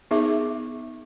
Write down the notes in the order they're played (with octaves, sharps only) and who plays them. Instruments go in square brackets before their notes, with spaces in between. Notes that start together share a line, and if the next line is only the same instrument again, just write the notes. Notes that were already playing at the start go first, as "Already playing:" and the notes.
[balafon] B3 D#4 G#4 E5 D6